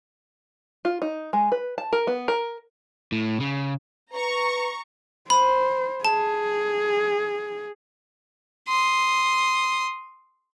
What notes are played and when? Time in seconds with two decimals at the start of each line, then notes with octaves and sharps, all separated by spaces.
0.85 F4
1.02 D#4
1.33 G#3
1.52 B4
1.78 A5
1.93 A#4
2.07 B3
2.28 A#4
3.12 A2
3.40 C#3
4.14 B4 A#5 C#6
5.30 C5 B5
6.05 G#4 A5
8.68 C6 D#6